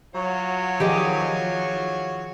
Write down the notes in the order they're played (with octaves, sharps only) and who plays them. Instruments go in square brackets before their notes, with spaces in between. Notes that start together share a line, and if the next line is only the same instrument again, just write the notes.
[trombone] F#3 [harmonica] F4 F#4 C#5
[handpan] D#3 F3 G#4 [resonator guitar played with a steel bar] G4 B4 D#5